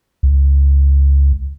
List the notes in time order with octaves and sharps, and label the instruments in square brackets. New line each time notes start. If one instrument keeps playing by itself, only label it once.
[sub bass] C#2